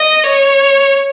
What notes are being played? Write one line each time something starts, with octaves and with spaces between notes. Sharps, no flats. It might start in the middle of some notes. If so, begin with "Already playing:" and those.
Already playing: D#5
C#5